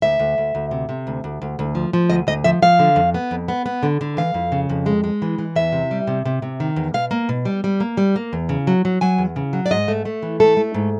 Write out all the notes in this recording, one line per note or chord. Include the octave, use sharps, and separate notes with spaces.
D2 E5
D2
D2
D2
C3
C3
D2
D2
D2
D2
F3
F3
D2 D#5
D2 D#5
F3 E5
F3 F5
D3
F2
B3
F2
B3
B3
D3
D3
E3 F5
F2
C#3
F2
G#3
G#3
E3
E3
E2 E5
C3
G3
C3
C3
C3
D#3
E2
B2 F5
A#3
B2
G3
G3
A#3
G3
A#3
E2
C#3
F#3
F#3
F#3 G#5
E2
C#3
F#3
D5
G#2 D#5
A3
A3
E3
A3 A4
A3
G#2